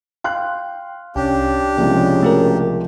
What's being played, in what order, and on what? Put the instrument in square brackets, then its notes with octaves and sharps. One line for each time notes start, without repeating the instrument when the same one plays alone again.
[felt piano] F5 C6 F#6 [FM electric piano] G5
[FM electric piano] C2 G5 [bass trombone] C#4 [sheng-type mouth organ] D4 G4
[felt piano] C2 F3 G#3 [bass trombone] C#3 [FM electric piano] D5
[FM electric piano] A3 F#4 A#4